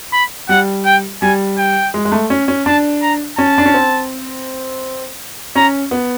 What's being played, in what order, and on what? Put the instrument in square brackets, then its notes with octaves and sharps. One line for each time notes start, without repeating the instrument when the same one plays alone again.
[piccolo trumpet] B5
[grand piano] G3 [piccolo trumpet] F#5
[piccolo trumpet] G5
[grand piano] G3 [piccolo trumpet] G#5
[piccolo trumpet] G5
[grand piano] G#3
G#3
A3
C#4
C#4
[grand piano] D4 [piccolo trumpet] A5
[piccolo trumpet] A#5
[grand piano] C#4 [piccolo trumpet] A5
[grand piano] D4
C#4
C4
[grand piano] C#4 [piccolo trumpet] A#5
[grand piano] B3